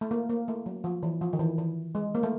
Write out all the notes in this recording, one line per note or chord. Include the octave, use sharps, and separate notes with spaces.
A3
A#3
A#3
A3
F#3
F3
E3
F3
D#3
E3
E3
G#3
A#3
A3